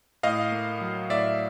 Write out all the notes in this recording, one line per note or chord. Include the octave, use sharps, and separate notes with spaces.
A2 D#5 F5
A#3
F#3
A2 D5 E5